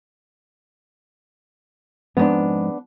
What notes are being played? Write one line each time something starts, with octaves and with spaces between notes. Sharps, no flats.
F2 G#2 B3 D4